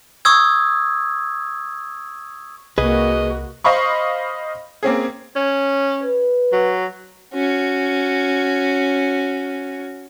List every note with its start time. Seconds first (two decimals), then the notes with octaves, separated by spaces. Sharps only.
0.25 C#6 D#6 E6 G#6
2.78 C2 A#3 F#4 G#4 B4 D#5
3.64 C5 D#5 F5 B5 C#6
4.83 A#3 C4 C#4 G#4
5.36 C#4
6.03 B4
6.52 F#3
7.33 C#4 F#4